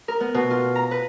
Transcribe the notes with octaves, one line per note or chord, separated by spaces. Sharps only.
A#4
B3
B2
F4
A#5
B4